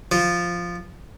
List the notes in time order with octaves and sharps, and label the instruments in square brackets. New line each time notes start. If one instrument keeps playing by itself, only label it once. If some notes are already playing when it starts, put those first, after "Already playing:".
[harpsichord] F3